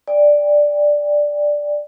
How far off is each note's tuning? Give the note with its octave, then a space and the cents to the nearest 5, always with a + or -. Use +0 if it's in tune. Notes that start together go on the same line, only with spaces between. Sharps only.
D5 +0 G5 +30